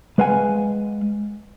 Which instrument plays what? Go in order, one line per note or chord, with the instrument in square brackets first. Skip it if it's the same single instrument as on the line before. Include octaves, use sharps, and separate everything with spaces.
[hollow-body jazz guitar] G#3 B4 F5 F#5 G#5